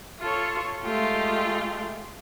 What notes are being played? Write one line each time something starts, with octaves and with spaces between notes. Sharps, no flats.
F4 A4 C#5
G#3 A3 F4 G4